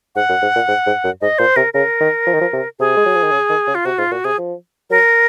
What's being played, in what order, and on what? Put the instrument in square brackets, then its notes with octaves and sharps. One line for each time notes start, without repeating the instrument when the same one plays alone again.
[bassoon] G#2 [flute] F#5
[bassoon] F#2
G#2
A#2
G#2
G#2
F#2
[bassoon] G#2 [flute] D#5
[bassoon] A#2 [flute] C5
[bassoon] C3 [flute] A#4
[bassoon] C#3 [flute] A#4
[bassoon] D#3
F3
D#3
F3
C3
[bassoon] C3 [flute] G#4
[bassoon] G#3
F#3
F3
D#3
C#3
D#3
C#3
[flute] F4
[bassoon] C3 [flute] F#4
[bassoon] G#2 [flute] F4
[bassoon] A#2 [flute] F#4
[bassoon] C3 [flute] G#4
[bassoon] F3
[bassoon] F#3 [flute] A#4